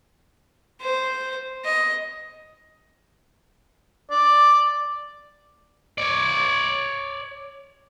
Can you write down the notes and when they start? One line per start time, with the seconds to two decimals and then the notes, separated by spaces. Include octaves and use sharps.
0.81 C5
1.65 D#5
4.11 D5
5.98 C#5 D5